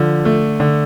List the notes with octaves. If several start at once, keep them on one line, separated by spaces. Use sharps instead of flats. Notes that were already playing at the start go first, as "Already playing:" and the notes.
Already playing: D3 F3
A3
D3